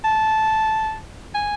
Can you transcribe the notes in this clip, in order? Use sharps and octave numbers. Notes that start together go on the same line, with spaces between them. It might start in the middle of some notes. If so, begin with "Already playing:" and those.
A5
G#5